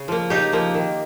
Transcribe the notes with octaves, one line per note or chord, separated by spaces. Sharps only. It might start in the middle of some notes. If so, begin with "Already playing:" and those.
Already playing: C#3
F3 A#3
C#3 D#4 G4
F3 A#3
D#3